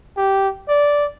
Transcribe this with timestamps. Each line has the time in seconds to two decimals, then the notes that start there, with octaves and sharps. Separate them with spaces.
0.17 G4
0.68 D5